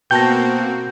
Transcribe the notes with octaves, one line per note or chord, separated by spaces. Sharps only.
B2 A#3 C4 F#4 G5 A5 G6 A#6